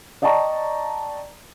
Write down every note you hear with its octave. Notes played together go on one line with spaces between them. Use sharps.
D5 D#5 G5 A5 A#5 C#6